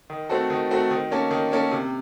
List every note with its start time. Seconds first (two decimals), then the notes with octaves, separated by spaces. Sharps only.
0.10 D#3
0.29 A3 C4 F#4 A4
0.50 D#3
0.71 A3 C4 F#4 A4
0.91 D#3
1.11 A#3 C#4 A4
1.31 D#3
1.51 A#3 C#4 A4
1.71 C3